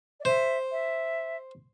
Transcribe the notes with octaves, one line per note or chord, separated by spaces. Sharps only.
D5
C5 E5
E5